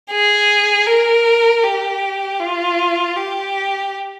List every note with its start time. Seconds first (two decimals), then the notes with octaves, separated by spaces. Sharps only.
0.11 G#4
0.87 A#4
1.64 G4
2.39 F4
3.16 G4